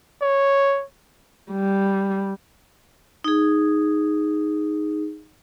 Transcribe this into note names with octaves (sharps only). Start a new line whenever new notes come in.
C#5
G3
D#4 G#4